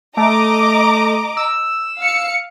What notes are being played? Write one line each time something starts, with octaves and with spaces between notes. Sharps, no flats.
A3 D#5 A#5 D6
E6
F5 C#7